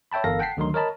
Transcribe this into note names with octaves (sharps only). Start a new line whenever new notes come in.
C#5 E5 G5 A5 B5
G1 E3 A4 A#4 F5 A#6
F#5 G5 A5 B6 C7
D2 D3 D#3 F#3 D#4 C6
A#4 C#5 D#5 A5 B5